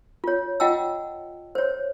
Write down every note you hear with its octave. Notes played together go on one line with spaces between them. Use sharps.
F4 C#5
F4 D#5 F#5 G5 A5 E6
C5 C#5